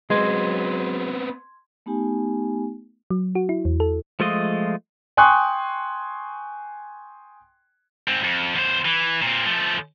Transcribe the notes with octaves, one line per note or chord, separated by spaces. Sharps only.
F#3 G#3 B3 C4 C6 G#6
A3 B3 D#4 G4 G#5
F#3
F#4
E4
E2
A4
F3 G#3 A3 F4 D#5
G5 G#5 C6 C#6 D#6 F#6
G#2 C4
F2
E2 C5
E3
A#2 C4
F3 A3